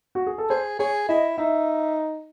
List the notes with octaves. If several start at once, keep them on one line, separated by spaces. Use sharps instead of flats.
F#4
G#4
A4
G#4 C5
G#4 C#5
E4 D#5
D#4 E5